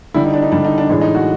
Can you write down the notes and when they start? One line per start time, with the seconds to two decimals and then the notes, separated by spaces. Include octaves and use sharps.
0.14 D3 G3 E4
0.25 D#4
0.34 D4
0.43 D#4
0.52 D3 G3 D4
0.65 D#4
0.78 D4
0.89 A2 E3 G#3 D4
1.02 D#4
1.15 F#4